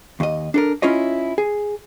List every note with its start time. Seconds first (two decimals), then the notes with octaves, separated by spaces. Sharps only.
0.20 D#2 D#5
0.54 D4 A4 A#4
0.82 C#4 E4 F4 C#5 D#5
1.38 G#4